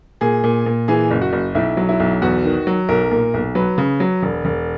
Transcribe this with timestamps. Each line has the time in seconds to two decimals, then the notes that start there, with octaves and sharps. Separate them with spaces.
0.21 A#2 G#4
0.44 A#2
0.66 A#2
0.88 E3 G#4
1.11 F#1
1.21 F#4
1.33 F#1
1.55 B1 E4
1.77 F#3
1.89 E4
2.00 B1
2.22 E2 F#4
2.44 D#3
2.67 F#3
2.89 B1 A#4
3.11 A#2
3.34 B1
3.55 F#3 B4
3.78 C#3
4.00 F#3
4.23 E1
4.45 E1